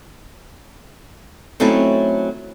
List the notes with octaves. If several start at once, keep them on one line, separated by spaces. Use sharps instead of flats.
F#3 A3 C4 C#4 D#4 E4